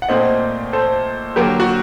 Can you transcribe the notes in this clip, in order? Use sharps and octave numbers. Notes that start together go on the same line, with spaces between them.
F#5
A#2 A3 C4 C5 D#5
A4 C5
D3 F#3 A#3 G4 A#4
F#4